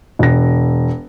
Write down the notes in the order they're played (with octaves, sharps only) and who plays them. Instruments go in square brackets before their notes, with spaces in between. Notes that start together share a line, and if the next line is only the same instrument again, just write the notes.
[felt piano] E1 A#6